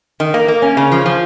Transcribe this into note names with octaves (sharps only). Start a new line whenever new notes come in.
D#3
A#3
A#3
C#4
C#3
F3
F3